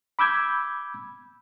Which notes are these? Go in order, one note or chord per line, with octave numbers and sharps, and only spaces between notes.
B5 D6 E6 G6 G#6